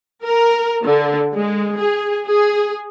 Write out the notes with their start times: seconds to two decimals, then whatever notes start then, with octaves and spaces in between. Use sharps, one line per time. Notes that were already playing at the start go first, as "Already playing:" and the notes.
0.25 A#4
0.84 D3
1.35 G#3
1.79 G#4
2.27 G#4